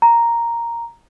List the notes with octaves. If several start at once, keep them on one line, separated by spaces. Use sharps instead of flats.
A#5